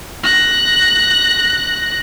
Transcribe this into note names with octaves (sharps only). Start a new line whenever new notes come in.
F#6 A#6